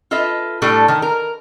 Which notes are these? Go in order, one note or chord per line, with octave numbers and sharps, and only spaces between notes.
F4 A4 B4 D#5 E5
A2 G3 A3 D4 A4 D5
D#3
A#4